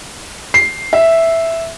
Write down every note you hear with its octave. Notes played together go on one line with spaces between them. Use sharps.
C7
E5